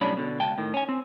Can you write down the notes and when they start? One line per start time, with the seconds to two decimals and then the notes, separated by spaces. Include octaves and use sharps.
0.01 B1 A2 G3 C#4 D4 B5
0.17 B2 D3
0.39 C#2 G5 A5
0.58 A2 D#3
0.74 C#4 G#5
0.89 C4